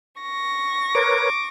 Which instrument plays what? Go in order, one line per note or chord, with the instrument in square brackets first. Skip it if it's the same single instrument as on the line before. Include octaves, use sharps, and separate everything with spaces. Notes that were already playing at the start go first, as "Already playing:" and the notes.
[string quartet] C#6 A#6
[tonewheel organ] A#4 B4 C#5 [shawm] D6